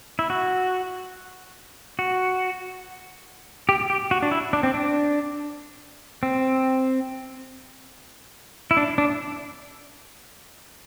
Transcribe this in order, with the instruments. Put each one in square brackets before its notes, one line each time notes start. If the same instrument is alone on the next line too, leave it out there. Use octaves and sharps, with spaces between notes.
[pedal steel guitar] E4
F#4
F#4
G4
G4
F#4
D4
E4
D4
C4
D4
C4
E4
D4
D4